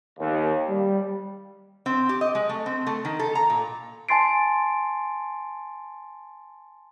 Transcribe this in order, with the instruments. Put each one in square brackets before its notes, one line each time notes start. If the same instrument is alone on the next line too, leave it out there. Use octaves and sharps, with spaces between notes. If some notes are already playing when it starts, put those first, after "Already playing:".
[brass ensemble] D#2
G3
[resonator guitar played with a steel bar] C4
G4
D#5
G#3
A3
C4
A3
D#3
A4
A#5
A#2
[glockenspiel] G#5 A5 C6 A6 C7 D7